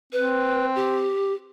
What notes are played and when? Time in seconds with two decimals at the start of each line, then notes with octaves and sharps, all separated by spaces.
0.13 C4 B4
0.75 G4